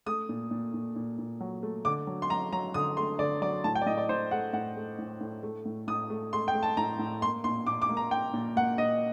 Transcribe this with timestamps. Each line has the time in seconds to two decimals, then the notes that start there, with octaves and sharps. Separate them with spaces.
0.06 A3 D#6
0.29 A#2
0.51 A#2
0.74 A#2
0.96 A#2
1.18 A#2
1.40 F#3
1.63 A3
1.85 D3 D6
2.07 F#3
2.22 C6
2.30 F#3 A#5
2.52 F#3 A#5
2.74 D3 D#6
2.97 A3 C6
3.19 D3 D5
3.42 F#3 D5
3.64 A2 A5
3.75 G5
3.82 D5
3.86 A2 D#5
3.98 D5
4.09 A2 C5
4.31 A3 F#5
4.53 A2 F#5
4.76 A3
4.98 A2
5.21 A2
5.43 A3
5.66 A2
5.88 A2 D#6
6.10 A3
6.33 A3 C6
6.48 G5
6.55 A3
6.63 A5
6.77 A2 A#5
6.99 A2
7.22 A#3 C6
7.44 A#2 C6
7.67 A#2 D6
7.82 D6
7.89 A#3
7.97 A#5
8.11 A#3 G5
8.34 A#2
8.56 A#3 F#5
8.78 A#2 D#5